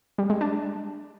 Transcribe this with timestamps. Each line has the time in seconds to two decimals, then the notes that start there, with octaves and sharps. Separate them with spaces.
0.18 G3
0.30 G#3
0.41 D4